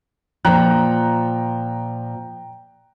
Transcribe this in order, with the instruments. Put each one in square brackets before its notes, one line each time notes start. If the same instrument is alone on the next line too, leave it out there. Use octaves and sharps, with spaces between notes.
[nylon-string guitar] A#2 F3 [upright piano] G5 A#5 F#6